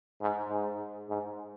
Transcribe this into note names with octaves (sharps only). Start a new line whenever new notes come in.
G#2
G#2
G#2